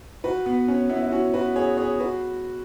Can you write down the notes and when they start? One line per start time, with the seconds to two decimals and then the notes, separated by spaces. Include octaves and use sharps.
0.24 F#4 B4
0.46 B3
0.68 C#4
0.90 B3 E4
1.02 E4
1.12 C#4 F#4
1.34 F#4 B4
1.56 G#4 C#5
1.77 G#4 C#5
2.00 F#4 B4